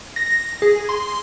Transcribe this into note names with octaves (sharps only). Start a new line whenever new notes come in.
A#6
G#4
C6